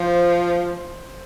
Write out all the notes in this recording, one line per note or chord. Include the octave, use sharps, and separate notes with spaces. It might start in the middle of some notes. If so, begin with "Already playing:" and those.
Already playing: F3 C5